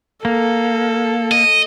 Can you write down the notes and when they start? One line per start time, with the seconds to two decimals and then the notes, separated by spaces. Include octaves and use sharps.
0.25 A#3 A4
1.32 D#5